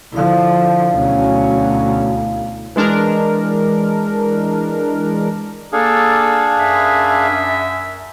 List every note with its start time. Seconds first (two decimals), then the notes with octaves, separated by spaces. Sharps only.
0.13 D3 F3 E4 F5
0.94 D2 B2 F#3 C#4
2.76 E3 G#3 D4 A#4
5.73 A#3 D4 G#4 A4 F5
6.59 F#2 E5